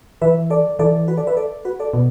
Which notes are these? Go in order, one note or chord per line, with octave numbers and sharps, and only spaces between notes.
E3 B4 E5
A4 D5
E3 A4 D5
F#4 B4
A4 D5
B4 E5
A4 D5
F#4 B4
A4 D5
B2